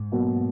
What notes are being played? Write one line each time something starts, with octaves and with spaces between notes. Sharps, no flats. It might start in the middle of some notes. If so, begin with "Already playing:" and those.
Already playing: G#2
B2 F#3 A#3